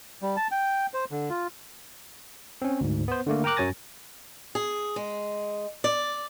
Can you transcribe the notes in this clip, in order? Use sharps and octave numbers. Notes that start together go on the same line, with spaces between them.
G3
A5
G5
C5
D3
F4
C4 C#4
D2 G#2
B3 C5
D3 A3 A#3
A#4 G5 A#5 D6 F#6
F#2 F#3 C#5 G#5 A6 A#6
G#4
G#3
D5